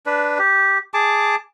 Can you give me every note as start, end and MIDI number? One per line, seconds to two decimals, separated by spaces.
0.06 0.38 62
0.06 0.38 71
0.38 0.78 67
0.94 1.36 68
0.94 1.36 81
0.94 1.36 86